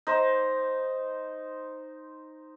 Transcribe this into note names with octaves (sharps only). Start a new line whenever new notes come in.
D#4 C5